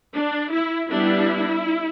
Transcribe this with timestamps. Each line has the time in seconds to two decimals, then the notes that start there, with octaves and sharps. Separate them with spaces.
0.15 D4
0.53 E4
0.90 G3 B3 D4 E4